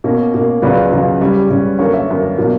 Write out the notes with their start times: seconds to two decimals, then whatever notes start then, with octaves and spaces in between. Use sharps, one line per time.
0.04 B2 A#3 C#4
0.34 B2 A#3 C#4
0.62 C#2 C#3 F#3 B4 D5
0.92 C#2 C#3 F#3
1.21 C#3 G3 C#4
1.50 C#3 G3 C#4
1.79 F#2 D3 A#3 A#4 C#5
1.93 C#5 E5
2.08 F#2 D3 A#3
2.38 B2 F#3 A#3 D4